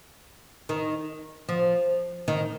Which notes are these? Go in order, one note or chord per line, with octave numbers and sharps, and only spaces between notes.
D#3
F3
D#3